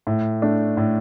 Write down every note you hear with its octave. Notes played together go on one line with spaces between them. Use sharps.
A2
A3 D4
A2